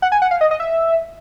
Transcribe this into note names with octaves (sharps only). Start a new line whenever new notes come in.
F#5
G#5
F#5
F5
D#5
D#5
E5